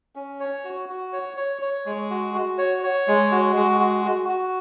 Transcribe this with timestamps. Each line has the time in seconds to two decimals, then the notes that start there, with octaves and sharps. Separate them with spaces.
0.16 C#4
0.40 C#5
0.64 F#4
0.89 F#4
1.13 C#5
1.37 C#5
1.62 C#5
1.86 G#3
2.10 F#4
2.34 F#4
2.58 C#5
2.83 C#5
3.08 G#3
3.32 F#4
3.56 G#3
3.80 F#4
4.05 F#4
4.29 F#4